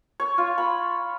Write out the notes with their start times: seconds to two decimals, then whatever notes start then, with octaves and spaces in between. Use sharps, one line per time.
0.20 C#5
0.38 F4
0.58 B5